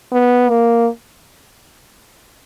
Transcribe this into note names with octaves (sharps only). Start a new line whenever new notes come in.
B3
A#3